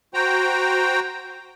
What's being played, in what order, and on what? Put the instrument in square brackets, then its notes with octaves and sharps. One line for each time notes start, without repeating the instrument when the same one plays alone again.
[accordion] F#4 C5 G5 A#5